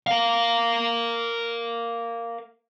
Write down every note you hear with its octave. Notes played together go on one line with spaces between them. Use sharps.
A#4 F5